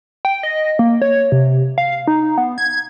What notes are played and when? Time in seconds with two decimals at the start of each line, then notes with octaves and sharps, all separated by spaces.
0.25 G5
0.43 D#5
0.79 A#3
1.02 C#5
1.32 C3
1.78 F5
2.07 D#4
2.38 B3
2.58 G#6